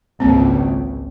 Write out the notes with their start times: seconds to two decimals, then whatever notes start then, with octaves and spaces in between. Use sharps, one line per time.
0.20 G#1 C#2 A#3 C4